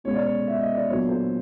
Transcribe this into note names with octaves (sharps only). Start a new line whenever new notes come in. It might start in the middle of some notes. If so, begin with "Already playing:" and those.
B2 G#3 C#4 C#5
D5
C#5
E5
D#5
D5
A#2 F#3 B3 D4 C#5
C5